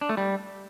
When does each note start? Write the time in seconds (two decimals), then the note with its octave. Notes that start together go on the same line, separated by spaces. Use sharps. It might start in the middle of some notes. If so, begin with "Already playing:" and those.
0.01 D4
0.09 A3
0.17 G3